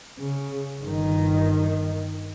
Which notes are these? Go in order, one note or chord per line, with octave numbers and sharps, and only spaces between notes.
C#3
G1 D#3